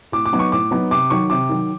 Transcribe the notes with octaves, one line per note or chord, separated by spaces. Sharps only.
A2 D6
D6
F#3 B3 D#4
C#6
A2 D6
F#3 B3 D#4
C3 D6
D#3 F#3 C#6
C3 D6
D#3 F#3